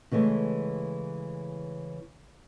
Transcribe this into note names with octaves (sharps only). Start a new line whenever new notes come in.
C#3 E3 G#3 A3